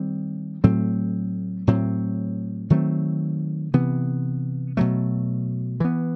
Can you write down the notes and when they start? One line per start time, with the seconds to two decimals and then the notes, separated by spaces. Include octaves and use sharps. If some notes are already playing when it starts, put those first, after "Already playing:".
Already playing: D#3 G3 C4
0.64 A2 F#3 A3 C4
1.67 A2 F#3 C4
2.70 D#3 F#3 A3 C4
3.74 C3 E3 B3
4.77 B2 F#3 A3
5.80 E3 B3